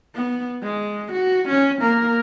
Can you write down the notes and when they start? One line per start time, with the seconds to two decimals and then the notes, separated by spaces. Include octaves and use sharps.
0.16 B3
0.63 G#3
1.13 F#4
1.49 C#4
1.82 A#3 A#4